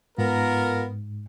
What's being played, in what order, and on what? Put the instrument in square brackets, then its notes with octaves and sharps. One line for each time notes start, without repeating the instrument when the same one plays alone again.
[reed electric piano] G#2 [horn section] B3 F4 A#4